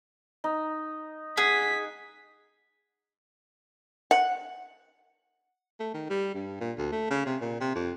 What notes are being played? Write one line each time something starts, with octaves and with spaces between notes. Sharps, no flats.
D#4
G#4 F#5 B6
F#5
A3
D#3
G3
G2
A#2
D2
A3
C#3
C3
A#2
C3
F2